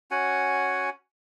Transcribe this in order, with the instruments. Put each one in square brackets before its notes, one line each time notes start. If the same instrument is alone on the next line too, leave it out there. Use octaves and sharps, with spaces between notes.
[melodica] C#4 F#4 F#5 G#5